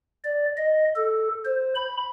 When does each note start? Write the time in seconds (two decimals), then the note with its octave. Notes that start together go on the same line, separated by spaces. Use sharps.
0.25 D5
0.57 D#5
0.96 A4
1.45 C5
1.76 B5